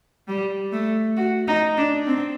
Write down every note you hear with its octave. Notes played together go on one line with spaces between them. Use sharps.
G3
A3
F#4
D#4
D4
C4